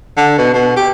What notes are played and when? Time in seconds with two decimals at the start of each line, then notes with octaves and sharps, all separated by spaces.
0.17 D3
0.38 B2
0.54 B2
0.77 G4